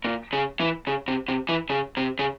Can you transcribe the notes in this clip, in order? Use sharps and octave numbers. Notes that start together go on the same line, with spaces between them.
A#2
C#3
E3
C#3
C3
C3
E3
C#3
C3
C#3